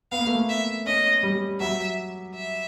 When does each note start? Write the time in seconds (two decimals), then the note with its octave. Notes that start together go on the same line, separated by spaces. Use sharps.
0.12 B3 F5
0.19 A#3
0.27 A3
0.34 A#3
0.49 E5
0.86 C#4 D#5
1.23 G3
1.60 F#3 E5
2.35 E5